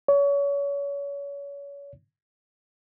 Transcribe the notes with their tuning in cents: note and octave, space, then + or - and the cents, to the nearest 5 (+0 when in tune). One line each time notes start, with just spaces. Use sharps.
C#5 +30